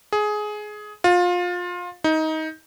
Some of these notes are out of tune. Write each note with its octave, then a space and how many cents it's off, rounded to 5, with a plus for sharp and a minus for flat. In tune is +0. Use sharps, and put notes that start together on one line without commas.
G#4 +15
F4 +25
D#4 +20